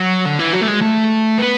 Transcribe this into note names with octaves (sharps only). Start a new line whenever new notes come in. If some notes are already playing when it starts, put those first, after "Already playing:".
Already playing: F#3
D3
E3
F#3
A3
G#3
A3
B3